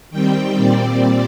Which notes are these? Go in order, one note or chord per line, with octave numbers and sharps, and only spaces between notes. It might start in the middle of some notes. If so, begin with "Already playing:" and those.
D#3 G3 C4 G5
A#2 G3 C4 D5